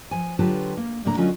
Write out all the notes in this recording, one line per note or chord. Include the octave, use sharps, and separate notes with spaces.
F3 G#5
D3 F#3 F4 G4 B4 A5
A#3
D2 A2 D3 A#3 D4 A#5
D3 F#3 C#4 F4 D#5